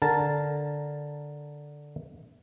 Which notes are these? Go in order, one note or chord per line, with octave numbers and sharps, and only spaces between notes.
D3 A#4 A5